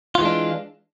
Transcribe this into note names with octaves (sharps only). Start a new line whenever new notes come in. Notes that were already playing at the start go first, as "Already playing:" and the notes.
E3 G#3 D4 F4